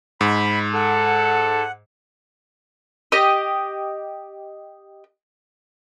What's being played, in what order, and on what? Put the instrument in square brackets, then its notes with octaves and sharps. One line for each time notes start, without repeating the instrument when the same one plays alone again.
[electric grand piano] G#2 [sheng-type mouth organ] B5
[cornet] A4 [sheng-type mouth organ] F#5
[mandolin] G4 D#5